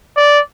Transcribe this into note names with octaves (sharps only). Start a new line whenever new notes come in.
D5